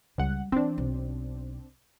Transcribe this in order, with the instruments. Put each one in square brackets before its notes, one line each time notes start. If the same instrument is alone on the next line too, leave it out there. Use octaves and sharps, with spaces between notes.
[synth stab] C#2 F#5 [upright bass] G3
[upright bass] E3 [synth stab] C4 D4
[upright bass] B1